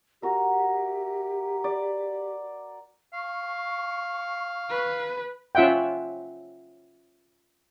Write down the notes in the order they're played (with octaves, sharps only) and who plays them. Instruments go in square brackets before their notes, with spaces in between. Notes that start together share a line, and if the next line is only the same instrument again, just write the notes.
[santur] F#4 A#4 E5 [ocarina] G4
[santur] D5
[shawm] F5 [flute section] C#6
[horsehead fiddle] B4
[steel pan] C#4 F4 E5 F#5 G5